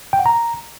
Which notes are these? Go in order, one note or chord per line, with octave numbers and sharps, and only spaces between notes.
G5
F#5
A#5